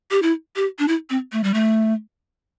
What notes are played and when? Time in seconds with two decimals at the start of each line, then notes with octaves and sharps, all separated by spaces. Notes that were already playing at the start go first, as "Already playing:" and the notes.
0.11 G4
0.22 E4
0.56 G4
0.79 D4
0.88 E4
1.10 C4
1.32 A3
1.44 G3
1.54 A3